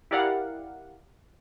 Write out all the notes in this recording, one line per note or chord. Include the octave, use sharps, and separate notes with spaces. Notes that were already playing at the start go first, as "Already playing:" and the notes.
E4 G4 A#4 D5 F5 F#5